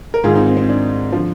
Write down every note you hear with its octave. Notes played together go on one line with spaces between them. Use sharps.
A#4
G#2 D#3 F4 G#4
C4 D#4
C4
C4
D4
D3 F3